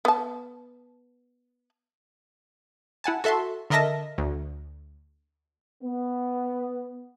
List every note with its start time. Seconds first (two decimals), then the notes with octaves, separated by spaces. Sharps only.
0.05 B3 A5
3.04 E4 F#5 G#5 A5
3.24 F#4 A4 E5 A5 C6
3.70 D3 A#4 D#5 E5 A5 A#6
4.18 D2
5.84 B3